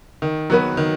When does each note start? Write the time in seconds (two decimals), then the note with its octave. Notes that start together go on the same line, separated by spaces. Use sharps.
0.22 D#3
0.50 F#3 B3 F#4 B4
0.77 D#3